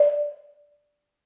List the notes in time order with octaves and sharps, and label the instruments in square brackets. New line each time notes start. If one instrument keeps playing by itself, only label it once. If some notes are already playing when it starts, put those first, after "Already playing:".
Already playing: [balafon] D5